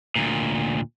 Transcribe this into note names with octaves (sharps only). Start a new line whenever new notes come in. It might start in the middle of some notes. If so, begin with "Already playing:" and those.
D2 A#2